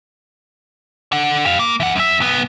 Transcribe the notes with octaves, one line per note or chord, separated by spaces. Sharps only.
D3 F#5
G4 F5
A#3
E3 F#5
F#2 E5
C2 B3